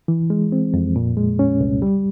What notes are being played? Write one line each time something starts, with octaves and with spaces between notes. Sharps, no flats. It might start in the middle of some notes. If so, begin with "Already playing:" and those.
E3
G#3
C4
F2
A#2
G#3
C#4
C2
G3